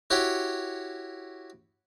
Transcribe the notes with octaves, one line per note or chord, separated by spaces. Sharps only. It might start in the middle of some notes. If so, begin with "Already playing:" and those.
E4 F#4 G4 C#5 G5